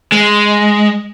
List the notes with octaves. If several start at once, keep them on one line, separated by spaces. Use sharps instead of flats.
G#3